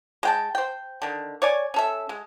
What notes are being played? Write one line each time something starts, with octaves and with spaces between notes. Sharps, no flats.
G#3 G5 A5
C5 G5
D3 D#3
C#5 D5 G#5
C#4 A4 E5
G#3